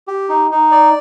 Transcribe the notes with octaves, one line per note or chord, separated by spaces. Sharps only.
G4
D#4
D#4
D5